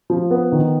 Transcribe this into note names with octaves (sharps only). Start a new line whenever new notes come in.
F3
B3
D#3